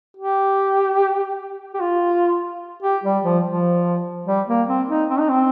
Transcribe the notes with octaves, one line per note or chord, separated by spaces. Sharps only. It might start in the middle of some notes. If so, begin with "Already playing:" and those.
G4
G4
F4
G4
G3
F3
F3
G3
A#3
C4
D#4
C4
D#4
C4